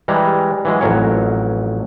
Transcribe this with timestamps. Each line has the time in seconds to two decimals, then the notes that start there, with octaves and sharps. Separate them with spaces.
0.08 E3 G3 G#3 A#5
0.65 E3 F#3 G#3
0.81 A1 F2 F#3 A#4 C#5